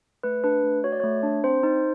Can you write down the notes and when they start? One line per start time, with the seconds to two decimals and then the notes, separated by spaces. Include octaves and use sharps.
0.23 A3 B4
0.44 D4 B4
0.64 A3
0.84 F#4 C#5
0.92 D5
1.00 A3 C#5
1.23 D4
1.44 C4 C5
1.63 D#4